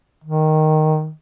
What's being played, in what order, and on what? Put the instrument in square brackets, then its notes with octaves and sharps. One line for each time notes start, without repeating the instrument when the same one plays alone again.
[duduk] D#3